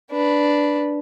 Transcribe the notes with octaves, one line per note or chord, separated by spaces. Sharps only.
D4 B4